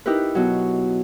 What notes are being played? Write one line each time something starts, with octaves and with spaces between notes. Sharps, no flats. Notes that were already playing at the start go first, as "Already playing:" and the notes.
D#4 E4 G4 A#4 B4
B2 F#3